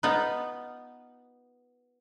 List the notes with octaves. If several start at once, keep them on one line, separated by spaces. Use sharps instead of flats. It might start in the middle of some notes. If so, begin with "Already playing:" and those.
B3 D#4 F4 B4